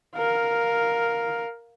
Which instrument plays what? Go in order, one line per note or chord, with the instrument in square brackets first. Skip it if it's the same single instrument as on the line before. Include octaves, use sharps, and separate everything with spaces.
[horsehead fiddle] A#4 F5